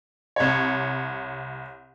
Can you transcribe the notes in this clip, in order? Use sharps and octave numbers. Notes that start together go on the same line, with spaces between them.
C2 C#5